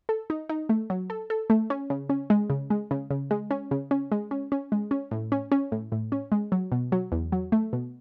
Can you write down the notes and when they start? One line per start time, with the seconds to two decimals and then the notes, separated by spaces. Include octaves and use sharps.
0.09 A4
0.30 D#4
0.49 D#4
0.69 A3
0.90 F#3
1.10 A4
1.30 A4
1.50 A3
1.70 C#4
1.90 C#3
2.09 C#4
2.30 G#3
2.50 C#3
2.70 G#3
2.91 C#3
3.10 C#3
3.31 G#3
3.51 C#4
3.71 C#3
3.91 C#4
4.12 G#3
4.31 C#4
4.52 C#4
4.72 G#3
4.91 C#4
5.11 A2
5.32 C#4
5.52 C#4
5.72 A2
5.92 A2
6.12 C#4
6.32 G#3
6.52 F#3
6.72 B2
6.92 F#3
7.12 E2
7.32 F#3
7.52 A3
7.73 B2